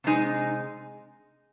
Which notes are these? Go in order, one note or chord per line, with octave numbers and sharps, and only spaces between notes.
C3 G#3 D#4